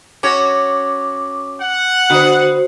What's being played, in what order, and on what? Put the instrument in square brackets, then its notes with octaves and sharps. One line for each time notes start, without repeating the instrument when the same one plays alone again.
[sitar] C#4 F#4 C#5 [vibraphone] D6
[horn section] F#5
[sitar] D3 B3 [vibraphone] F#4 C5